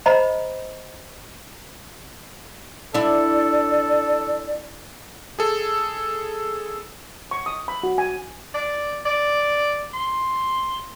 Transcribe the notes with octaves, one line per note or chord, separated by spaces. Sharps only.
C5 D#5 A#5 B5
D4 E4 A4 D5
G#4 A4
C#6
D#6
B5
F#4
G#5
D5
D5
C6